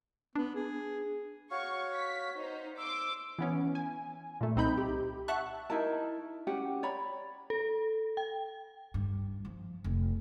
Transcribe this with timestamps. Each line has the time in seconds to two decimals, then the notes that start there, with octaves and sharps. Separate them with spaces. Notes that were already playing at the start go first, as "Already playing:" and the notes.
0.36 B3 D4
0.55 G#4
1.51 F#4 C#5 F5 C#6
1.95 B6
2.36 D#4 C5
2.78 C6 D6 E6
3.39 E3 B3 C#4
3.75 G#5
4.41 A#2 A3
4.56 C2 C4 D#4 B5 G6
4.78 G4
5.28 E5 F#5 A5 C#6 F#6
5.70 D#4 E4 A#4 A5
6.47 C#4 G4 F#5
6.83 C#5 D5 B5
7.50 A4
8.17 G5
8.94 G2
9.45 F3
9.84 F1